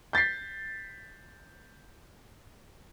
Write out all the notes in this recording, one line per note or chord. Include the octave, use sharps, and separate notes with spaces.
G6 A6 B6 C7